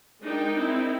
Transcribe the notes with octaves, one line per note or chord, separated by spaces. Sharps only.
G#3 D4 D#4 A#4 G5
C4 D#4 E4